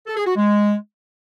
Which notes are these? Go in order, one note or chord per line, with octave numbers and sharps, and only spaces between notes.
A4
G#4
F#4
G#3